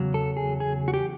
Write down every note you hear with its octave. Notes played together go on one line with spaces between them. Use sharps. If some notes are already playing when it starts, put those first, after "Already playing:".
Already playing: E2 C#3 F#3
A4
G#4
G#4
F#4
G4